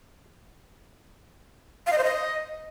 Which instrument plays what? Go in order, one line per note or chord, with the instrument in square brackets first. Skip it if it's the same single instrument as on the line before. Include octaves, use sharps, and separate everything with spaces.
[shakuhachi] F5
D#5
C5
D#5